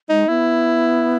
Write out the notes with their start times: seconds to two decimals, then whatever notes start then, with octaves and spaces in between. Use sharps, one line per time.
0.09 G#3 D#4
0.28 B3 E4